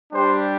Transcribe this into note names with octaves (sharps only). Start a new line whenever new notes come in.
G3 D4 G4 C5